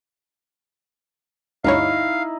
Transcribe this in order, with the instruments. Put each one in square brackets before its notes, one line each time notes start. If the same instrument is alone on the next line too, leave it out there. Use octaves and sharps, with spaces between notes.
[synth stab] D2 G2 C#5 [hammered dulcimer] D#4 E4 [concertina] F5